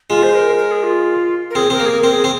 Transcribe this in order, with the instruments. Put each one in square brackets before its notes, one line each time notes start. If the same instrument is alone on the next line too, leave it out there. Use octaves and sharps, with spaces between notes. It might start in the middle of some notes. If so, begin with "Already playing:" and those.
[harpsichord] G#3 [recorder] F4
[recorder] C5
A#4
A#4
G#4
F4
A#4
[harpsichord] C4 [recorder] G#4
[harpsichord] C4 [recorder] A#4
[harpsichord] A#3
[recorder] G#4
A#4
[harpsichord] C4
[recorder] G#4
[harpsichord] C4